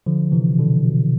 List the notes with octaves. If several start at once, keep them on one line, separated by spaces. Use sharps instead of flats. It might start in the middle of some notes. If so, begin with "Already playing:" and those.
D3 F3
C3 E3
B2 D3
B2